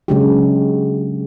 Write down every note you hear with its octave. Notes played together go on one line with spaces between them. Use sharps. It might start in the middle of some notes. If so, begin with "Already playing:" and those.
C#3 F#3 G#3 D4 F#4 G4